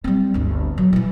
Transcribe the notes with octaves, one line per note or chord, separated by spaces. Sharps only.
G3 C4
G1 D2
F#3
D#3 E3